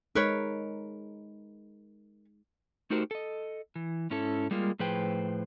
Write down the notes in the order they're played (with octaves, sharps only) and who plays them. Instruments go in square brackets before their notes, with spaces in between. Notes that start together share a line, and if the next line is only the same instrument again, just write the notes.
[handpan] G#3 D#4 [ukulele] A#4 B4 C#5
[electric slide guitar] A3 D#4 F#4 G4 A#4 C5
A4 D#5
E3
G#2 C#4 E4 A4
G3 G#3 A#3 F4
A2 F3 G#4 B4 C5 G5